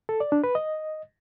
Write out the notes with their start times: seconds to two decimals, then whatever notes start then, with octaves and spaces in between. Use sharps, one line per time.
0.09 A4
0.20 D5
0.32 D4
0.44 B4
0.55 D#5